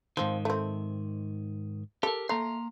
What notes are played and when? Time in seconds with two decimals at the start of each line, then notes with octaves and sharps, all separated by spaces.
0.17 G#2 D#3 F3 C4
0.45 A3 C4
2.03 G4 A4 A#4
2.29 A3 A#3 A#5 C6